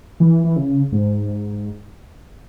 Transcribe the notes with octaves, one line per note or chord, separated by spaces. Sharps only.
E3
E3
C#3
G#2